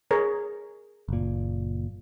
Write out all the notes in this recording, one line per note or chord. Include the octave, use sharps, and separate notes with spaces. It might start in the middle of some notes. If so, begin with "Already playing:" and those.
G#4 A#4 C#5
F#1 A#2